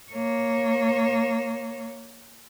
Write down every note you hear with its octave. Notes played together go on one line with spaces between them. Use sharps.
A#3 C#5